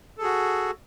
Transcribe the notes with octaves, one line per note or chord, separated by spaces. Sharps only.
F#4 G#4 A4